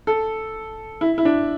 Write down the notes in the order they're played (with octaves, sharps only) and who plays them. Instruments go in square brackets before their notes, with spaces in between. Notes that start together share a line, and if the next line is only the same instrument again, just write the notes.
[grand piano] A4
E4
E4
D4